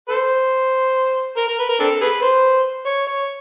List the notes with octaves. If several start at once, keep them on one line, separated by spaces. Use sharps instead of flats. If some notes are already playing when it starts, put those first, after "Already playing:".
A4 C5
A#4
A#4
B4
A#4
C4 D4 A4
G#4 B4
C5
C#5
C#5